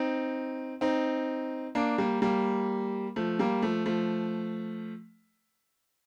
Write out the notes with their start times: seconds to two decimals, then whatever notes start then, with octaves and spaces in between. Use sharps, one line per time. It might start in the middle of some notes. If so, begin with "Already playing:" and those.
Already playing: C4 D#4
0.81 C4 D#4
1.75 A#3 D4
1.98 G3 A#3
2.22 G3 A#3
3.16 F3 A3
3.39 G3 A#3
3.62 F3 A3
3.86 F3 A3